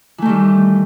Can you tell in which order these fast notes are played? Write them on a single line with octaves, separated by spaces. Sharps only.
E3 A3 D#3 G3